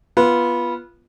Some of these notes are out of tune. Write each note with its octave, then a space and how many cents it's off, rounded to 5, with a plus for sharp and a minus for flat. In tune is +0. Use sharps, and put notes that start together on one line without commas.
B3 -15 F4 -10